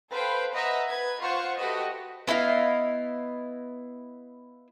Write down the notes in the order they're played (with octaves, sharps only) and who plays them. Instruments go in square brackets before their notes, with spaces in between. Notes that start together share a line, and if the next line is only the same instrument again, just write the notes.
[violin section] A4 B4 C5 F5 G5
B4 D#5 E5 F#5 A#5
B4 G#6
F4 C5 F#5 C#6
A3 F#4 G4 B4 D#5
[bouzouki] B3 E4 D#5 F5